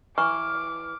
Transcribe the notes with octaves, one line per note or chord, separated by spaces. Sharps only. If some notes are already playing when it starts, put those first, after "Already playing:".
E3 C#6 D6 F6